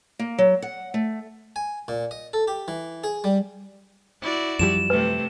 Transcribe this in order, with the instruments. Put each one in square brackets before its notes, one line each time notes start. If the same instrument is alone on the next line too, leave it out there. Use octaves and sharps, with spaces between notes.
[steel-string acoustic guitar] A#3
F#3
F#5
A3
[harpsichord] G#5
A#2
D#5
A4
G4
E3
G#4
G3
[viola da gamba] E4 F#4 D5
[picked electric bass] F#2 F3 G3 [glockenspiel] E7
[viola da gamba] C3 A3 [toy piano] B4